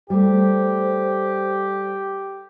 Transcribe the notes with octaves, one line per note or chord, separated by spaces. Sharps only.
G3 A3 G4 C5